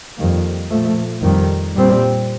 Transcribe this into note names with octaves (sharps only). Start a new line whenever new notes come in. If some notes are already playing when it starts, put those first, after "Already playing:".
F2 D#3 G3 A#3
A#2 F3 A3
F2 D#3 G3
A#2 G3 C4